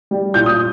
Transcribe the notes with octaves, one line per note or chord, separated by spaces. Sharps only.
G3
A#2 G6
D#6